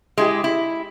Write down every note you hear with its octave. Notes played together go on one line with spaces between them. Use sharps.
G#3 E4 G4
E4